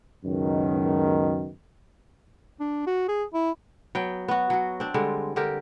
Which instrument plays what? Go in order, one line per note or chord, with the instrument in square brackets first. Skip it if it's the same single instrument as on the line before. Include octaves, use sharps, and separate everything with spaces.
[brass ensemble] C#2 F#2 B2 D#3
[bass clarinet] D4
F#4
G#4
E4
[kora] F#3 B3 G5
B3 F#4
F#3 F#4
C4 D4
D3 G3 G#3
D3 G4 A#4